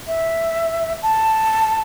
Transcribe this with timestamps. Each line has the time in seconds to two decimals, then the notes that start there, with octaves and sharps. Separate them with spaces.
0.07 E5
1.02 A5